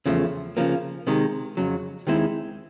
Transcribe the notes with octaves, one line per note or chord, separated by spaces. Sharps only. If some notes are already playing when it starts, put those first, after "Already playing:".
E2 C#3 F3 A3
C#3 F3 A#3
C3 D#3 G#3
F2 C#3 F#3
D#2 D#3 G#3 C4 E4